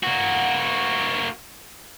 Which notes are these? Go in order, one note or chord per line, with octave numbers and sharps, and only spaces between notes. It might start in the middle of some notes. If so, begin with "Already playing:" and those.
A#3 F#4